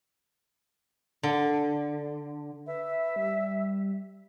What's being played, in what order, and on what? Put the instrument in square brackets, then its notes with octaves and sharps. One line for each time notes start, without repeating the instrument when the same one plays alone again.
[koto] D3
[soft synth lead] B4 [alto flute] E5
[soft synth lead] G3